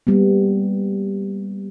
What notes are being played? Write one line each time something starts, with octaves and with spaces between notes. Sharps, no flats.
G3 A#3 B3